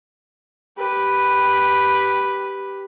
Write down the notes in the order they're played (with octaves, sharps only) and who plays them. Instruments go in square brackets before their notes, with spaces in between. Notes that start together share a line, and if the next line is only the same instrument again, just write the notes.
[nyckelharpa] G4 B4